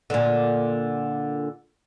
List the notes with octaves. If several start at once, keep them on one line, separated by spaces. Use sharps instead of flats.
A#2 D3